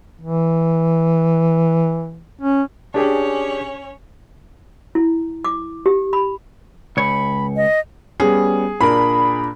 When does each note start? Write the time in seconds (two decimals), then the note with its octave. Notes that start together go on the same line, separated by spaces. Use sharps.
0.21 E3
2.41 C#4
2.94 C#4 D4 G4 G#4 C#5
4.95 E4
5.45 D6
5.86 G4
6.13 B5
6.97 C#2 C#5 B5
7.56 D#5
8.20 G3 B3 C#4 G#4
8.81 A#2 D4 A#4 B5